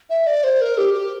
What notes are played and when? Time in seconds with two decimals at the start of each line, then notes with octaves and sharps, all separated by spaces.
0.10 E5
0.27 D5
0.44 C5
0.61 A#4
0.78 G4
0.94 G4